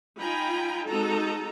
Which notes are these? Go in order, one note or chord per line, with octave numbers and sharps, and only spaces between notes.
D#4 F4 G5 G#5 A#5 B5
G#3 C4 D#4 F#4 A4 A#5